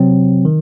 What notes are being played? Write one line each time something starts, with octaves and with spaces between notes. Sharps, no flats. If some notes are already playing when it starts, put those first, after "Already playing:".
Already playing: C3 F#3 C4
D#3